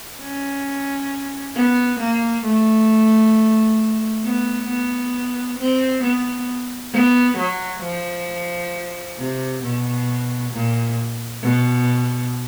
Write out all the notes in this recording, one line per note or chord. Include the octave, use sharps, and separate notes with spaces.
C#4
B3
A#3
A3
B3
B3
C4
B3
B3
F#3
F3
C3
B2
A#2
B2